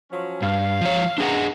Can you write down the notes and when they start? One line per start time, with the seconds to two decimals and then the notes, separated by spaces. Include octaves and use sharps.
0.11 F3 F#3 C#4
0.42 G2 F5
0.81 F3 C#5
1.18 F#2 B3 D4 G#4 F#5 A#5